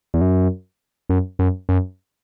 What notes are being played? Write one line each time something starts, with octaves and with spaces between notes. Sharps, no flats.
E2
F#2
F#2
F#2
F#2